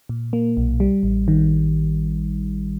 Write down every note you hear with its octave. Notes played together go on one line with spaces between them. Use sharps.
A#2
A#3
B1
G3
A1
D#3